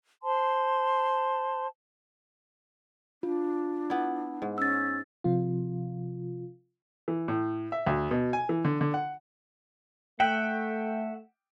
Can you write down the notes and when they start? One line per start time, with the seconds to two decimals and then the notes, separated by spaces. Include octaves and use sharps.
0.23 C5 A5 C6
3.23 D4 F4
3.90 B3 E4
4.42 G#2
4.58 C#4 E6 A6
5.24 C3 F3 F4
7.08 E3
7.28 A2
7.72 E5
7.86 D2
8.11 B2
8.33 G#5
8.49 E3
8.65 D3
8.81 D3
8.94 F#5
10.20 A3 E5 F#5 G5